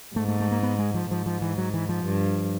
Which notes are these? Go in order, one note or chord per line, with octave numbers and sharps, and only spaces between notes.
G#2 A3
A3
A3
A#3
B3
G#3
F3
G#2 F3
F3
E3
F#3
E3
F3
G2